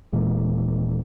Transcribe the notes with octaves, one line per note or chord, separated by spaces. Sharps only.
D#1 A#2 E3 G#3